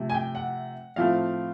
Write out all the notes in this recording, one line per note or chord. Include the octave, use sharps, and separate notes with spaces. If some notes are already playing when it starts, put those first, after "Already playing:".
Already playing: C3 F3 A3
G#5
G5
F#5
A2 F3 A3 C4 F5